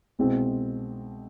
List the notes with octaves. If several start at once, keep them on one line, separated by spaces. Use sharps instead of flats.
C2 B2 G#3 C4